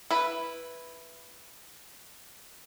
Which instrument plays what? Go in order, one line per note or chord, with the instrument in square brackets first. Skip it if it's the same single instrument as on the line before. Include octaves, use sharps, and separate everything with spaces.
[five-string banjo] E4 B4